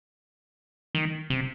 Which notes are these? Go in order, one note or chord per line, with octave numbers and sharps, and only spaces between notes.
D#3
C3